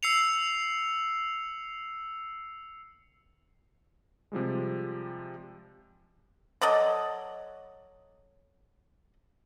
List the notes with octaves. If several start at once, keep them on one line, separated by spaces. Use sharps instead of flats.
E6 C7 C#7 F7
C3 F3 G3 G#3
F#3 A4 D5 D#5